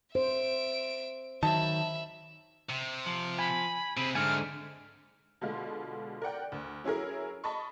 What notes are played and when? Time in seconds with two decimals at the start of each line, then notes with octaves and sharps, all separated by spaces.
0.15 C5 E5 D7
1.43 D#3 F#3 E5 A5 B5
2.69 C3
3.06 F3
3.39 G#5 B5
3.97 C3 C4 G#4 B5
4.15 G#2 D3 A3 C4 G#5 F6
5.41 B2 D3 G#3 F4
6.22 A#4 D5 F#5 G5
6.52 D2
6.84 F#3 C#4 E4 G#4 A#4
7.44 D#5 A5 B5 C#6